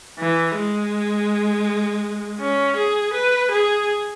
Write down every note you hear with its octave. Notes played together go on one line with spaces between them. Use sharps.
E3
G#3
C#4
G#4
B4
G#4